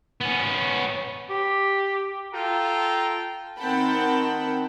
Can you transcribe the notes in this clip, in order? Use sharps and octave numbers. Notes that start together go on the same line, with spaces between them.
B3 C#4
G4
F4 A4 G5 A5 A#5
D#3 C4 F#5 G5 A5 B5